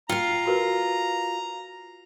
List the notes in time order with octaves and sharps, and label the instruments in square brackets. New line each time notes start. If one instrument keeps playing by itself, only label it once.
[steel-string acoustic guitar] F4 F5 [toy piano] G5 [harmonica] A#5
[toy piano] F#4 A#4 B4